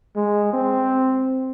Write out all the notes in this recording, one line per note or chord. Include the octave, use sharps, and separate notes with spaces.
G#3
C4